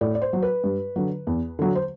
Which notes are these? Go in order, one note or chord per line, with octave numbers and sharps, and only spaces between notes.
A2 D5
D5
C5
F#3
B4
G2
D3 F#3
E2
D3 F#3
C5